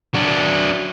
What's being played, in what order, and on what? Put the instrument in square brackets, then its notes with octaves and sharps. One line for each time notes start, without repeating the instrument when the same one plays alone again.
[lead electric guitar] F#3 D4